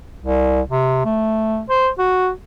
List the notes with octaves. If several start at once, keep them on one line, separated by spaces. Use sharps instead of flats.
C2
C3
A3
C5
F#4